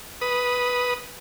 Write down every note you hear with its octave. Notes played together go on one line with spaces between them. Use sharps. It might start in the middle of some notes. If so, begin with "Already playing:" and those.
B4 D#6